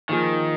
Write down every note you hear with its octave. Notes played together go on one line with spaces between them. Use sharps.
D#3 F3 A#3 F4 G#4